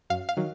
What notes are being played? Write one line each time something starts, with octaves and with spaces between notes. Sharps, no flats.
F#2 F5
F5
D#3 F#3